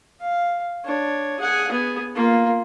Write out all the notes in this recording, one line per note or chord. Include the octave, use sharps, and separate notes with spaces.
F5
D4 C#5
G#4 F#5
B3 G#4
A#3 F4